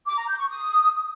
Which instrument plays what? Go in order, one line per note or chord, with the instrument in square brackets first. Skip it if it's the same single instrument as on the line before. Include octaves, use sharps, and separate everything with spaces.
[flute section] D6
A#5
G6
C#6
D#6